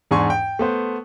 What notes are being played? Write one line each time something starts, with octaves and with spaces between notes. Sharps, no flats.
E2 G#2 D4 G#5 C6 C#6
G5
A3 B3 C5